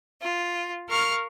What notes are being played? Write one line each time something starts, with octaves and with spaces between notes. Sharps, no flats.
F4
A#4 F5 C#6 F6